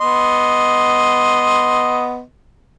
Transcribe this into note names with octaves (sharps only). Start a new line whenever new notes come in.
B3 D#5 C6